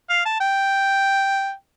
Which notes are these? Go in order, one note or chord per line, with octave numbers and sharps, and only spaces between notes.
F5
A5
G5